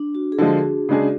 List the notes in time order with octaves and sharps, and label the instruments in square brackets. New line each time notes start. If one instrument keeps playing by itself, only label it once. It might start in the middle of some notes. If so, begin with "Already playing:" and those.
Already playing: [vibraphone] D4
F#4
G#4
[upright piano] D3 F3 G#3 [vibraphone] F#4
[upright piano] C#3 G#3 D4 G#4